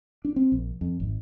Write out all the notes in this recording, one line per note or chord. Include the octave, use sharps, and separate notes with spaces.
D4
C4
A#1
F2
G#1